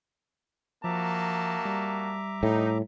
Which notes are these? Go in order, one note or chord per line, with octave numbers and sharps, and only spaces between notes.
F3 A#3 F#4 E5 A5 A#5 D6
G3
A2 D#4